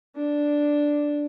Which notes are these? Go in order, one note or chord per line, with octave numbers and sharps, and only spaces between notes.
D4